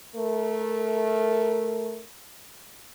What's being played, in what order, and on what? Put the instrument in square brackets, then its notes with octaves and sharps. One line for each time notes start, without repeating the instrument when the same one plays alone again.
[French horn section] A3 A#4